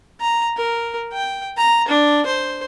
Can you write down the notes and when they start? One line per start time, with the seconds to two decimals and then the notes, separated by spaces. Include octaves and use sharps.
0.20 A#5
0.57 A#4
1.13 G5
1.57 A#5
1.88 D4
2.26 C5